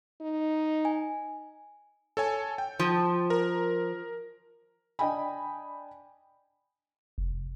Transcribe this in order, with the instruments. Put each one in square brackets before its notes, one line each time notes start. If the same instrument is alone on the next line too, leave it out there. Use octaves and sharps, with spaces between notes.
[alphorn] D#4
[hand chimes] G#5
[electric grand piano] A4 C#5 G#5
G5
[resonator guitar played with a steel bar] F3
[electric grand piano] A#4
[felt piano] D4 D#5 G5 G#5 B5
[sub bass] F1